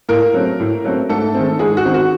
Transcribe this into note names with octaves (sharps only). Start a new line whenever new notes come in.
A2 A#3 A#4
F#3 A3 C4
A2
F#3 A3 C4
G#2 A3 A4
D#3 G#3 C4
G#2 G#3 G#4
F#4
D#3 G#3 C4
F#4